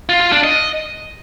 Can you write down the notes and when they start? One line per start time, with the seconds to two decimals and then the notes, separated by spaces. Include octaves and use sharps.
0.09 F4
0.21 F4
0.32 D4
0.44 D#5